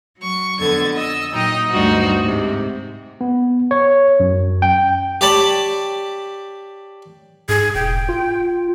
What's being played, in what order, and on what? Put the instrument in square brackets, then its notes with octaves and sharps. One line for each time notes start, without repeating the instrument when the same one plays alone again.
[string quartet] F#3 C#6
F2 D3 B3 A4 G#6 A6
D#5 E6
A#2 F#3 D#4 D#5 G5
D2 G2 G3 D#4 F#4 C5
G#2 C3
[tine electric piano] B3
C#5
F#2
G5
[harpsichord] G4 C#5 D5 G5 A5 B5
[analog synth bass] G#2 [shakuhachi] G#4
[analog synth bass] E1 [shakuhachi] G5
[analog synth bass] F4